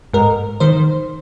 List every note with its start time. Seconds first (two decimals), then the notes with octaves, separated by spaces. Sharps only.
0.13 G#2 A#4
0.60 D#3 C5